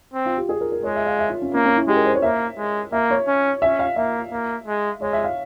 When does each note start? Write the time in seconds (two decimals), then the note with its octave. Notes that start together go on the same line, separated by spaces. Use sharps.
0.14 C4
0.26 F4
0.37 G4
0.49 G#4
0.61 A#4
0.72 A#4
0.83 G#3 C#5
0.96 E5
1.06 F5
1.19 E5
1.30 F4
1.42 C#4
1.54 A#3 C#4
1.65 C#4
1.77 E4
1.88 G#3 G4
1.96 A#4
2.05 C5
2.14 C#5
2.22 A#3 E5
2.58 G#3
2.92 A#3 E5
3.10 C#5
3.27 C#4
3.62 C#4 E5
3.79 F5
3.96 A#3 E5
4.31 A#3
4.66 G#3
5.01 G#3 C#5
5.13 E5
5.24 F5